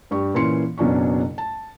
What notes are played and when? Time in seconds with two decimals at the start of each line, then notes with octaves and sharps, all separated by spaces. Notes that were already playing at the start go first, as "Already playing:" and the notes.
0.11 G2 G4 C#6
0.34 A#2 E3 C#4 C6 C#7
0.78 F#1 B2 F#3 C#4 D4 C#6
1.38 A5